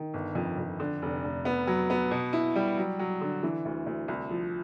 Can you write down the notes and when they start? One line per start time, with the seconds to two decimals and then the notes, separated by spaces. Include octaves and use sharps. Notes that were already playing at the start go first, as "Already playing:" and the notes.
Already playing: D#3
0.14 G1
0.35 F2
0.58 F2
0.80 D3
1.02 F1
1.24 F1
1.45 B3
1.67 F#3
1.90 B3
2.11 B2
2.33 E4
2.56 G3
2.77 F#3
2.99 F#3
3.21 D3
3.43 E3
3.65 D2
3.86 D2
4.08 C2
4.31 F3